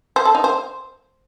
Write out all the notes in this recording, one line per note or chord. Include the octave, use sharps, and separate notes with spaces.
C5
A4
D#4
C5